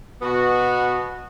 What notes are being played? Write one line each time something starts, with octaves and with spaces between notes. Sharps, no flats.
B2 B3 F#4